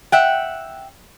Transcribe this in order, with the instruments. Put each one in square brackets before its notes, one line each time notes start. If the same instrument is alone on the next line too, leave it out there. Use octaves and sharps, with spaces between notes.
[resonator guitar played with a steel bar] E5 F#5 G5